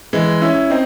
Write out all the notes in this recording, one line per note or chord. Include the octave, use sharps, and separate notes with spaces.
E3 G#3
C#4 E4
C4 D#4